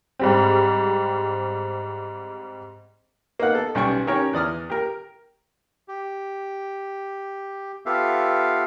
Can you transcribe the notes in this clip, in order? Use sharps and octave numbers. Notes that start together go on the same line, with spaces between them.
G#2 G3 C4
A#3 B3 D#4 F#5
B3 A4
B1 G3 C#4 G5 C#6
D#3 C#4 G4 A#4 C#5
E2 D5 D#6 F6
G4 A#4
G4
B3 F4 G4 A4 E5 F5